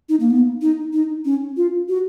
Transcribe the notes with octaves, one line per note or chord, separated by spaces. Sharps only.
D#4
A#3
B3
D#4
D#4
C#4
F4
F#4